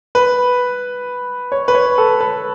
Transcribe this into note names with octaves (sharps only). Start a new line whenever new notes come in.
B4
C#5
B4
C#5
A4
B4